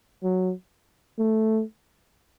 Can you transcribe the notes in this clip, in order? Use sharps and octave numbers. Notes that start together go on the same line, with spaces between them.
F#3
A3